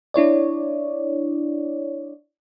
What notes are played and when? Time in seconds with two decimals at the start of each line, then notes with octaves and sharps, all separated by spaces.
0.14 D4 E4 C#5 D5